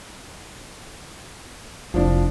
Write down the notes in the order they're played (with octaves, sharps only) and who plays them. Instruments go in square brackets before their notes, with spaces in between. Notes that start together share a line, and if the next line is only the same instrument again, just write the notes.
[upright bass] F1 E4 [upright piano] F3 D4